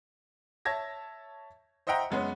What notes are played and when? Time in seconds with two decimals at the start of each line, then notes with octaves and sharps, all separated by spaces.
0.65 C#5 E5 A5 G#6 A#6
1.87 C5 D#5 E5 F#5 G5 A#5
2.10 F#2 G#3 B3 C#4